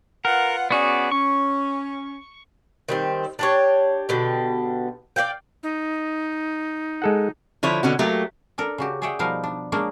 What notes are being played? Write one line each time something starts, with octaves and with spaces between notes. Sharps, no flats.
F4 A#4 B4 F#5
B3 C#4 F#4 G#4 D5
C#4 C#6
D#3 G3 C4
D4 G4 C#5
B2 D3 G4
D5 D#5 F5 G5
D#4
G#3 A4 F#5
D3 F3 E4 C#5
B2 D3 C#4 F#4
F#3 A3 A#3 G4
D4 A4 A#4
C#3 F#4 G4
G#4 C#5 D5 E5 F#5 G5
B2 F3 G3 D#4 A#4 F5
D4
G#3 A#3 C#4 D4 A#4